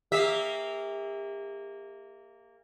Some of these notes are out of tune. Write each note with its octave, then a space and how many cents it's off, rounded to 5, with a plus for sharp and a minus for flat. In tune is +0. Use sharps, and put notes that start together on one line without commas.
A#3 -15 G4 +40 E5 -20